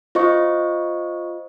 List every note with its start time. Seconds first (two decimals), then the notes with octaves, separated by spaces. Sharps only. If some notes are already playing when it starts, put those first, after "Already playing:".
0.15 F4 C5 D#5 C#6